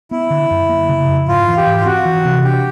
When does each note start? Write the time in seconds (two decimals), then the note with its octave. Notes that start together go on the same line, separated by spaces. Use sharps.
0.11 B3 E4
0.30 D3
0.51 F#2
0.69 A#3
0.89 C#3
1.08 F2
1.27 G#2 F4
1.48 E3
1.57 G4
1.66 G#2
1.81 F4
1.86 C4 F#4
2.05 E3
2.25 C3
2.44 D4 G4